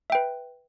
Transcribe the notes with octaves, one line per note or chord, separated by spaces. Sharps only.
B4 E5 G5